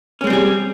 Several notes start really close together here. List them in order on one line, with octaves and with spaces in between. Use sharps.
C#4 G#3 C4 G3 G#4